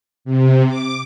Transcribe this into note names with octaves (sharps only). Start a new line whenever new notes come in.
C3
D6